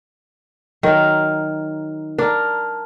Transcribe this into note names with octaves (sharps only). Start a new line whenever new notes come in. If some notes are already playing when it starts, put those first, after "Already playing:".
D#3 F#3 A#4
D4 A#4